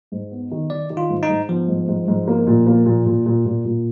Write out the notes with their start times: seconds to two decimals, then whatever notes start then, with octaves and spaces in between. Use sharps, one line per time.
0.12 G#2
0.31 B3
0.51 D#3
0.70 D#3 D5
0.90 D#3
0.97 F4
1.10 G#2
1.23 D#4
1.29 G#2
1.49 F3 B3
1.68 G#2
1.88 G#2
2.08 G#2
2.28 A#3
2.47 A#2
2.67 A#3
2.86 A#2
3.06 A#2
3.26 A#2
3.45 A#2
3.65 A#2